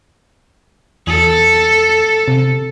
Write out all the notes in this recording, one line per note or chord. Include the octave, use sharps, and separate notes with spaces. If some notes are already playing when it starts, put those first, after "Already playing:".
E2 A4
C3